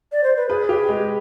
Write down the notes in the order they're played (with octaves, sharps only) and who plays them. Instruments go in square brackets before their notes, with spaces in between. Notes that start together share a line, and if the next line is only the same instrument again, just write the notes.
[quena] D5
C5
B4
[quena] G#4 [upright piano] B4
[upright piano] G4
G#3